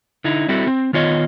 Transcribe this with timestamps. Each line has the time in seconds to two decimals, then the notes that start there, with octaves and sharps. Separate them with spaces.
0.24 D3 D#4 E4
0.48 G3 C4 E4 F#4 A4
0.67 C4
0.93 D#3 B3 F4 C#5 D#5